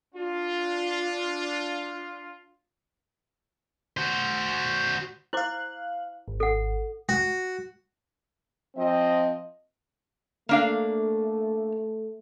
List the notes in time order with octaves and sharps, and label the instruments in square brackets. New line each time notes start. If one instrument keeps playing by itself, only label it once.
[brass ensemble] D4 F4
[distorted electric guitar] F#4 C5
[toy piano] E4 C5 D6 [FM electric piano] F5 F#6
[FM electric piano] G#1
[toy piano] A4 F#5
[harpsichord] F#4
[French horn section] F3 C4 D#5
[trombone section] A3 [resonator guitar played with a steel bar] A#3 D4 F5